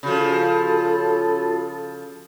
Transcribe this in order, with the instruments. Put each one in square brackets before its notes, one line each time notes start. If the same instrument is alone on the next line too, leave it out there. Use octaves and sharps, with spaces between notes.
[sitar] C#3 F3 [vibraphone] F4 F#4 B5 [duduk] A4